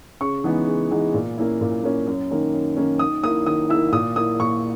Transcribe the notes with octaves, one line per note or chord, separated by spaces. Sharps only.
C#3 C#6
E3 G#3 B3 D#4
C#3
E3 G#3 B3 D#4
A#2
A#3 C#4 E4
A#2
A#3 C#4 E4
F#2
D#3 A#3 C#4
F#2
D#3 A#3 C#4
D#3 D#6
A#3 E4 D#6
D#3 D#6
A#3 E4 E6
A#2 D#6
A#3 E4 D#6
A#2 C#6